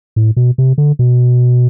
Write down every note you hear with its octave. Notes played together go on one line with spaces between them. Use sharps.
A2
B2
C3
D3
B2